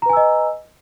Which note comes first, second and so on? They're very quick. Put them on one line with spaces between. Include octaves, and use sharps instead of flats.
A#5 B4 G#5 E6 D#5